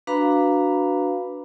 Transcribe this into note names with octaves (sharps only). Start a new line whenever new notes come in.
D4 F#4 B4 F5 A#5 B5